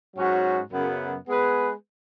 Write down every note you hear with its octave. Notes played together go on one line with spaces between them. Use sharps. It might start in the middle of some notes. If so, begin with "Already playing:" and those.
G#2 F#3 C#4 F#4
F#2 C#3 B3
G#3 B3 G#4 B4